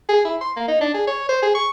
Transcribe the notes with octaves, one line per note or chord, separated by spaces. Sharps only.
G#4
E4
C6
A#3
D#4
D4
G#4
C#5
C5
G#4
C#6